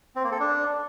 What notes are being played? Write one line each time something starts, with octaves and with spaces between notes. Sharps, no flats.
C4
A#3
A4
D4